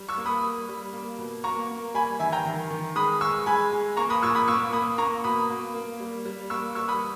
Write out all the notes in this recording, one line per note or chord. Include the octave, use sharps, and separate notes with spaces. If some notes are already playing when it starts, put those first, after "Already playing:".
Already playing: G3
C#6 E6
A#3
B5 D#6
G3
G3
A#3
B2
A#3 A#5 C#6
A#3
G3 G#5 B5
D#3 E5 G#5
G5 A#5
D#3
D#3
G#3 B5 D#6
G#3 C#6 E6
G#3 G#5 B5
G#3
A#3 A#5 C#6
B5 D#6
A#2 C#6 E6
B5 D#6
A#3 C#6 E6
A#3 B5 D#6
A#3 A#5 C#6
B2 B5 D#6
A#3
A#3
G3
G3
A#3 C#6 E6
G3 C#6 E6
B5 D#6